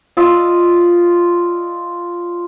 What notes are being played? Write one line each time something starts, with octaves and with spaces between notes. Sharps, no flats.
F4 D5 D#5 E6